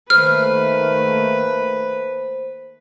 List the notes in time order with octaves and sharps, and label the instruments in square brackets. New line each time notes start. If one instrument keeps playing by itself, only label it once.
[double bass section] D#3 A3 A#3 [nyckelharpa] B4 [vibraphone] C5 [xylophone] F6